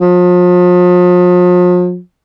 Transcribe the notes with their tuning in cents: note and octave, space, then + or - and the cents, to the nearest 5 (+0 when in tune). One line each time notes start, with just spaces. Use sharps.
F3 +40